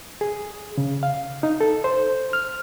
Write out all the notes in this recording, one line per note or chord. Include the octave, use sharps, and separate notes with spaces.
G#4
C#3
F5
D#4
A4
C5
F6